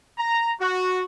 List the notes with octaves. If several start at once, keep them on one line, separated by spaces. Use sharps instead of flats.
A#5
F#4